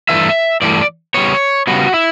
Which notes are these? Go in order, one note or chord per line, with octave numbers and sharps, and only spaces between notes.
G2 E3 A3 E5
G2 E3 A3 D5
C#3 G3 B3 C#5
C#3 G3 B3 F#4
E4